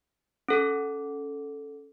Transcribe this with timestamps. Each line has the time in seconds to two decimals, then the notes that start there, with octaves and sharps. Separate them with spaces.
0.48 C#4 A4